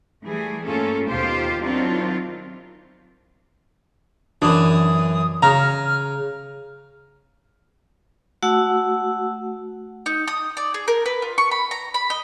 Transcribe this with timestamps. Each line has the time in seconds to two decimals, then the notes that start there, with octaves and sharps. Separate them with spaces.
0.23 E3 G3 A3 G#4
0.65 G2 A3 A#3 C#4 F4 A4
1.09 D#2 B2 F4 G4 C5 F5
1.60 D#3 F#3 C4 D4 E4 F4
4.42 F#2 E3 D4 D#6
5.42 C#3 A#5 F6
8.43 A3 F#4 F#5 E6
10.06 D#4
10.28 D#6
10.57 D5
10.74 G#4
10.88 A#4
11.06 B4
11.22 F4
11.38 C#6
11.51 B5
11.71 A#5
11.94 B5
12.10 D#5